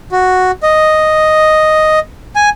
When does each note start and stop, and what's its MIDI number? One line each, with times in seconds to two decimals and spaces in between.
0.12 0.51 66
0.63 1.99 75
2.36 2.49 80